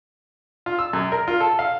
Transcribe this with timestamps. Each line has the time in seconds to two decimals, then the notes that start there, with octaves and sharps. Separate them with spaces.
0.66 F4
0.79 E6
0.93 F#2
1.12 A#4
1.28 F4
1.40 A4
1.59 F5